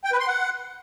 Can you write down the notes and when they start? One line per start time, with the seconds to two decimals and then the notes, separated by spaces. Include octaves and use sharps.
0.04 G5
0.12 B4
0.20 C6
0.27 F#5